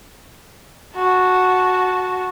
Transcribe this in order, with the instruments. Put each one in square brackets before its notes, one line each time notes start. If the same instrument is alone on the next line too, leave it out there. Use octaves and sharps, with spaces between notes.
[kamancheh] F#4 A5